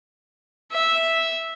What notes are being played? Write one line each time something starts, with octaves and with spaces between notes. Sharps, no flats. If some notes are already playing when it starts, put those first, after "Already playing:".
E5